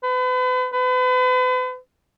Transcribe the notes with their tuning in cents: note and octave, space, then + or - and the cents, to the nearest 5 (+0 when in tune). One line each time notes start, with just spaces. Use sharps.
B4 +40
B4 +40